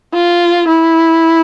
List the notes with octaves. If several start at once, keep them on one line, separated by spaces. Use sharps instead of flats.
F4
E4